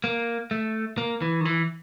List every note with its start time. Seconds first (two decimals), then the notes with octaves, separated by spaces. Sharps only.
0.04 A#3
0.51 A3
0.98 A#3
1.22 E3
1.41 D#3
1.45 E3